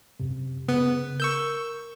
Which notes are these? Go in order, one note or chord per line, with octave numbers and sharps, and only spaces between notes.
F#2 C3
C#3 B3
A#4 C#6 E6 G6